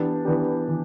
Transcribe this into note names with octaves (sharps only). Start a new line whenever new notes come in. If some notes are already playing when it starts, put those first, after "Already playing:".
Already playing: E3 B3 D4 G4
E3 B3 D4 G4
E3